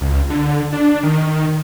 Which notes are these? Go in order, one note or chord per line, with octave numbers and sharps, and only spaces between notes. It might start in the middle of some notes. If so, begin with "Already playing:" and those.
C#2
D3
D4
D#3